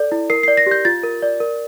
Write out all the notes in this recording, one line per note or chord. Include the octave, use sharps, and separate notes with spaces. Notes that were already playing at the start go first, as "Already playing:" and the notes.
Already playing: A4 D5
E4
A#4 C7
D5 C7
A#6
G4 G6
F4 A6
A#4
D5
A#4